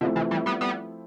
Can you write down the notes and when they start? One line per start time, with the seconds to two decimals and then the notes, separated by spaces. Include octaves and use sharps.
0.01 B2 D3 F3 A3 C4 E4
0.16 C3 E3
0.31 E3 G3
0.46 G3 B3
0.61 G3 B3